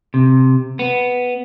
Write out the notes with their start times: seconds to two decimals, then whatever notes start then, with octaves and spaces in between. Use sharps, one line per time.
0.14 C3
0.79 B3